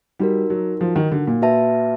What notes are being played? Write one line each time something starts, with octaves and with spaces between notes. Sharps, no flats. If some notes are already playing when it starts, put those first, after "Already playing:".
G3 D#4 F#4 A#4
F#3
F3
D#3
D3
A#2
F#4 B4 E5 A5